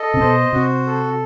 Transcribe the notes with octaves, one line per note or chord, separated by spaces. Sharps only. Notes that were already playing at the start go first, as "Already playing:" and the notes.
Already playing: A4 D#5
C3
B2 C5
C3 F#4
A4